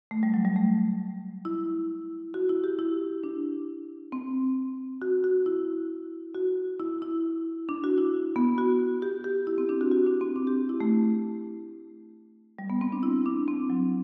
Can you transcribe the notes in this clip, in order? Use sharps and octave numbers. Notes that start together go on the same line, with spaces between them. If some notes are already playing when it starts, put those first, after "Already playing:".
A3
G3
F#3
G3
A3
E4
F#4
E4
G4
E4
D4
C4
F#4
F#4
E4
F#4
E4
E4
D4
F#4
E4
B3
F#4
G4
G4
E4
C4
D4
F#4
F#4
D4
C4
D4
G4
E4
A3
G3
B3
C4
D4
E4
D4
C4
F#3